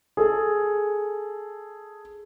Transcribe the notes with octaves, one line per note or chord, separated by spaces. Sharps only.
G#4 A4